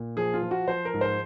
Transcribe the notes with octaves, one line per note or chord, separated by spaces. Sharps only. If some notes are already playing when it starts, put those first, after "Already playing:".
Already playing: A#2
F3 G#4
F4
F3
F#4
F3 C5
A#4
G#2
C5